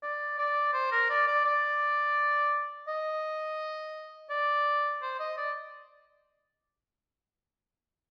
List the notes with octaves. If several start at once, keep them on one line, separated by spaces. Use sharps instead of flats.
D5
D5
C5
A#4
D5
D5
D5
D#5
D5
C5
D#5
D5